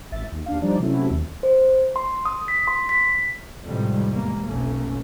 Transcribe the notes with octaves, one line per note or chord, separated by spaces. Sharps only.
G#1 E5 A6
D#2
D#2 D4 F5
F3 G3 D4 D#4 D5
C3 F#3 A3 C#4 E4
D#2
C5
C6
D#6
B6
C6
B6
F2 A2 C3 D#3 G3 G#3
E2 G#3 A#3
F1 B1 A3 A#3 C#4